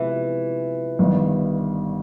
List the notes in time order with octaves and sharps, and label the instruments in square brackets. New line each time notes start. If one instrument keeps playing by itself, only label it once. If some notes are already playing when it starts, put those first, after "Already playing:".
Already playing: [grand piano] C3 F3 G#3 B3 [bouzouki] E3
[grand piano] G1 G2 D#3